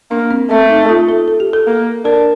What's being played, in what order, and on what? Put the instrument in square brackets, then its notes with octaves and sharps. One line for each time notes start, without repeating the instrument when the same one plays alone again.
[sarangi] A#3 [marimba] D4
[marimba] C4
[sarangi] A3 [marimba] C4
[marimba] D#4
F4
A4
A4
G4
A4
[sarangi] A#3
[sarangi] D4 [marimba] A#4